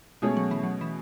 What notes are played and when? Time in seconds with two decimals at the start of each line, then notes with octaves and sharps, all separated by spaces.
0.22 B2 G#3 A3 C#4 G#4
0.37 F#3
0.51 E3
0.63 F#3
0.81 E3